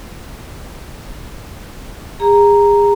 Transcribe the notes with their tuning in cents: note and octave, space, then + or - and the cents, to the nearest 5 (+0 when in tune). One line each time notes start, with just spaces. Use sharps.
G#4 -35 A#5 +0